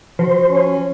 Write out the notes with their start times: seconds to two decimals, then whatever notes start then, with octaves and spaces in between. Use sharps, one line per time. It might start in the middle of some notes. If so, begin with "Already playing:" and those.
0.19 F3 F#4 C5
0.50 C#4